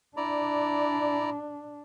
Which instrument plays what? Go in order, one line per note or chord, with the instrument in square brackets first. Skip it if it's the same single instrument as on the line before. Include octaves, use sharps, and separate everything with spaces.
[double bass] D4 [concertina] E4 D5 A#5